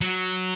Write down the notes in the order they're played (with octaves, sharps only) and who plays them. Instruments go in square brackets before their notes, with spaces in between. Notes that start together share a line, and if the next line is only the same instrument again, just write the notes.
[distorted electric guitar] F#3